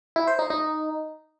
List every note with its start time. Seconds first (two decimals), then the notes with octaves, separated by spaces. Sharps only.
0.16 E4
0.27 C5
0.39 D#4
0.50 D#4